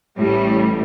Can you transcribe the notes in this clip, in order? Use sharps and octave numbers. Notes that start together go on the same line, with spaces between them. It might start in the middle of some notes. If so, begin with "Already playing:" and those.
A1 A2 G3